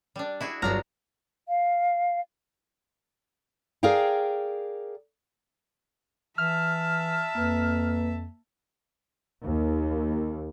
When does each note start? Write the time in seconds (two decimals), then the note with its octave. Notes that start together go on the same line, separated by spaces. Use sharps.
0.16 G3 D4
0.41 E4 F#4 G#4
0.62 G1 F#3 B3 D4 A#5 F6
1.49 F5
3.83 G#4 A#4 D5 F5 G5
6.38 E3 E5 A5 F6
7.35 F2 A#3 B4
9.44 D#2